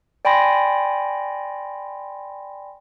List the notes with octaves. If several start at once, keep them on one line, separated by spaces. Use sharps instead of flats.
D5 G5 G#5 B5 C6 A#6